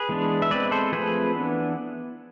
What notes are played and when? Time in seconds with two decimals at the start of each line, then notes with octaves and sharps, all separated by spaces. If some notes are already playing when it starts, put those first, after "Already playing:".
Already playing: G#4 B4
0.09 E3 G#3 B3 D4
0.42 E5
0.51 G#3 C4 B4 D5
0.71 A4 C5
0.92 F3 A3 C4 G#4 B4
1.35 E3 B3 D4